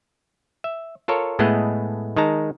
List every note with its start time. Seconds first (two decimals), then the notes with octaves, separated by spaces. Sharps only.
0.64 E5
1.08 F4 A4 A#4 C#5
1.39 A2 G#3 A3 B3 G#4 D#5
2.16 D#3 G#3 D#4 A5 A#5